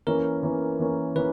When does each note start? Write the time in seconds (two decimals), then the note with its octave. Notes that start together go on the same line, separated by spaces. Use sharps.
0.07 E3 A#3 C#4 A#4
0.43 E3 A#3 C#4
0.80 E3 A#3 C#4
1.16 E3 A#3 C#4 B4